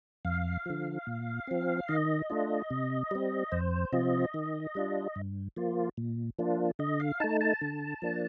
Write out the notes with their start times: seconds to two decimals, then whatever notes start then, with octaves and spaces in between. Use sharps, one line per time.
0.25 F2 F5
0.66 D3 F3
1.07 A#2
1.47 F3 C4
1.89 D#3 D#5
2.30 A3 D4 F4
2.70 C3
3.11 G3 C4
3.52 F2 C5
3.92 C3 F3 C4 F4 D#5
4.34 D#3
4.75 G3 D4 F4
5.16 G2
5.56 F3 A#3 F4
5.97 A#2
6.39 F3 A#3 D4 F4
6.79 D3 D#5
7.00 F5
7.20 A3 D#4 A5
7.41 A5
7.61 D3
8.02 F3 A#3 D4